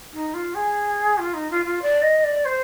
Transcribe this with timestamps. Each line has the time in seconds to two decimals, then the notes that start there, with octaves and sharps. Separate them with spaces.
0.13 D#4
0.34 F4
0.55 G#4
1.18 F4
1.34 D#4
1.51 F4
1.65 F4
1.82 D5
2.02 D#5
2.24 D5
2.45 C5